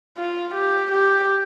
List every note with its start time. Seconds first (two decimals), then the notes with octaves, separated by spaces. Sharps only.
0.17 F4
0.54 G4
0.92 G4